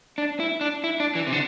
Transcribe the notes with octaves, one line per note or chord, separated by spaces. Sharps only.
D4
E4
D4
E4
D4
E3
C3
D3